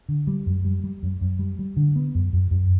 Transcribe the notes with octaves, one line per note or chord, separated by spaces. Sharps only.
D3
G3
F#2
G3
G3
F#2
F#2
G3
G3
D3
B3
F#2
F#2
F#2